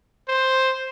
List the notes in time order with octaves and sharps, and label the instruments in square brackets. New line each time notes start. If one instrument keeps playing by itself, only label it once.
[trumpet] C5